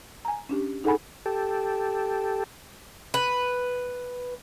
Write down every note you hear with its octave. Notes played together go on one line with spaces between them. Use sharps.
G#5 A#5
C#4 D4 G4
D#4 G#4 A4 F#5 G#5 B5
G4 A4
B4